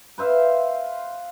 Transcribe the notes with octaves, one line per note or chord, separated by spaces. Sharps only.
B4 C5 E5 F5